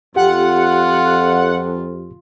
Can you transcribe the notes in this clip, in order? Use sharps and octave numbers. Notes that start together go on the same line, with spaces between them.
F2 F4 G4 F#5